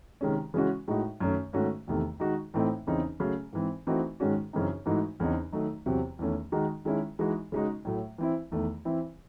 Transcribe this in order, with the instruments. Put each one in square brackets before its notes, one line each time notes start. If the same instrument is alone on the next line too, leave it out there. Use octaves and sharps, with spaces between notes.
[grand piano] C3 D#3 G#3 C#4
C#3 E3 G#3 C#4 F#4
A2 G#3 D#4 F#4
F#2 D#3 A3 C#4
G#2 D#3 A3 C#4 F#4
E2 C3 D#3 A3
D#3 G#3 D#4 F#4
A2 E3 A3 C4 D#4
E2 C#3 E3 C4 D#4
C#3 F#3 A3
G#2 E3 C4
E3 A3 C4 D#4 F#4
G#2 D#3 G#3 C#4 F#4
F#2 C#3 E3 C4 D#4
G#2 E3 A3 D#4 F#4
E2 C#3 E3 C4 D#4
D#3 F#3 A3 D#4 F#4
E2 C3 F#3 C4 F#4
E2 D#3 A3 C#4
D#3 G#3 D#4 F#4
D#3 G#3 C#4 E4
E3 G#3 D#4 F#4
C#3 G#3 D#4 F#4
A2 F#3 A3
E3 C4 E4
E2 D#3 A3
E3 C4 E4